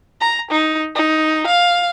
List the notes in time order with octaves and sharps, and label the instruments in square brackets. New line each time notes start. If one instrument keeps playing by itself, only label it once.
[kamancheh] A#5
D#4
D#4
F5